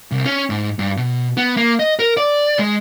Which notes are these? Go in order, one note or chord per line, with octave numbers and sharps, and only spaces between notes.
C2
C#4
G#2
G2
B2
B3
A#3
D#5
A#4
D5
G#3